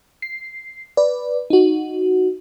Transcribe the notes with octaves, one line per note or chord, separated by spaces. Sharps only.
C7
B4 D5
D#4 F#4